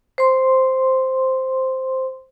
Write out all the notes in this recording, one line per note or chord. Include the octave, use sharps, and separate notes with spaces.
C5 C6